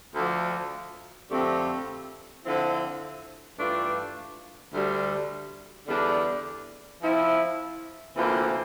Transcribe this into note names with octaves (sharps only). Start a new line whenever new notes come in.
D2 D3 F3
F2 D3 A3 C4 G4
D3 F3 C4 E4
G2 E3 A3 D4 F4
D2 D3 G3
E2 D3 G3 D4
F3 C4 E4
D2 C3 E3 A#3 F4